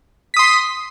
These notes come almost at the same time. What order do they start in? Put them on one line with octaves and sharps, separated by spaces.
B6 D#6 C6